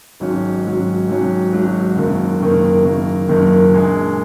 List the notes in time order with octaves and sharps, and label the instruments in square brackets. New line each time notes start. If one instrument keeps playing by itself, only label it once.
[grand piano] G#1 G#2 F#3 C#4
G#1 G#2 F#3 C#4
G#1 G#2 F#3 C#4
G#1 G#2 F#3 C#4
F#1 F#2 D#3 A#3
F#1 F#2 D#3 A#3
F#1 F#2 D#3 A#3
F#1 F#2 D#3 A#3
A#1 A#2 G#3